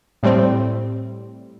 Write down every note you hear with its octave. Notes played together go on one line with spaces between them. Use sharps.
A2 G3 C4